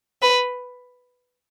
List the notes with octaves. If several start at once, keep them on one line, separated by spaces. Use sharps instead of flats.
B4